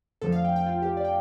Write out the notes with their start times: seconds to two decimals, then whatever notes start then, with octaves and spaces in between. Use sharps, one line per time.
0.22 F2 D3 F3 A3 A4
0.32 F5
0.44 G5
0.56 G5
0.66 F4
0.82 G4
0.97 D5
1.05 G5